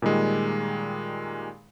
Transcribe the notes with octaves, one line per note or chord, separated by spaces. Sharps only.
A#2 D#3 G3 G#3